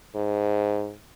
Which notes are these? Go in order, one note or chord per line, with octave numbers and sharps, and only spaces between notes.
G#2